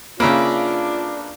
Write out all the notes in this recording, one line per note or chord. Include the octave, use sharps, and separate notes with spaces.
C#3 A#3 D4 F4 B4 E5